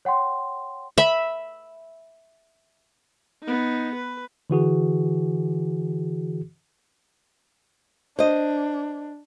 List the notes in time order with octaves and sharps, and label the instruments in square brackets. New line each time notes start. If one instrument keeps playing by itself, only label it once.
[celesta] C#5 F#5 G5 C6
[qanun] E5 B5
[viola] B3 D#4
B4
[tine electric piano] D3 E3 F#4 G#4
[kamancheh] D4 [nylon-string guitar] C5 D#5